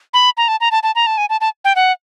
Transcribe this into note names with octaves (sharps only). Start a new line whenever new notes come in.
B5
A#5
A5
A#5
A5
A5
A#5
A5
G#5
A5
A5
G5
F#5